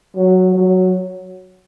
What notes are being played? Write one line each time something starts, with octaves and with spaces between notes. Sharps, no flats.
F#3
F#3